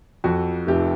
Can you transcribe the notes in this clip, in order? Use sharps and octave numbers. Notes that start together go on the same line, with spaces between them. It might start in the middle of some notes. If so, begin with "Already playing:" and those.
F2 F#4
F1 G4